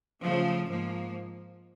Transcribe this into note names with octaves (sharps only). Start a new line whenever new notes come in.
C#3 F3 A3
G#2 F3 A#3